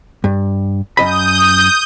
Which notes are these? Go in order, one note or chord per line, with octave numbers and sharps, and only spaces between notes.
G2
F#2 D#5 B5 D#6 G6